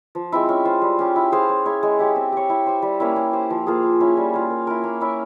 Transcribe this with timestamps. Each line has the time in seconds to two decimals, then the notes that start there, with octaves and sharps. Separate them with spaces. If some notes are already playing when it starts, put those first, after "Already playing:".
0.15 F3
0.32 G#3 C4 E4
0.49 C#4
0.65 F4 C5
0.82 G3
0.99 C#4 G4
1.16 E4
1.32 G#4 C5 F5
1.49 C#4
1.66 E4 G#4 C#5
1.83 G#3
1.99 E4 G4 C#5
2.16 C4
2.32 G4 C#5
2.49 E4
2.66 G4 C5
2.82 G3
3.00 A#3 C#4 E4
3.16 C#4
3.33 G4 C5
3.50 F3
3.67 A#3 F4 G#4
3.83 A#3
4.00 C#4 E4
4.17 G3
4.34 C#4 F4
4.50 A#3
4.67 E4 A#4
4.84 A#3
5.01 C#4 E4 A#4